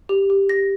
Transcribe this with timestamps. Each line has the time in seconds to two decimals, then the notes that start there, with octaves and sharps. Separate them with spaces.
0.09 G4
0.30 G4
0.49 G4 A#6